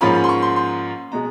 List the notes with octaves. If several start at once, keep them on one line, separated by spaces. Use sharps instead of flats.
G#2 F3 A#3 C#4 F4 B5
B5
C6
C#6
C6
C6
B2 G#3 A#5